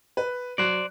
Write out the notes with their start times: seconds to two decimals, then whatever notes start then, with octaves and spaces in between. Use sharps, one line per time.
0.17 B4
0.58 F#3 C5 D5 F#6